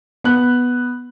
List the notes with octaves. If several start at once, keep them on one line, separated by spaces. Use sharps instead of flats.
B3 F#6